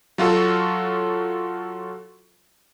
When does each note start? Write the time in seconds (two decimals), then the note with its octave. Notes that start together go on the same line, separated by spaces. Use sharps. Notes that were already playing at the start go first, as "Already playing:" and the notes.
0.18 F#3 F4 F#4 A4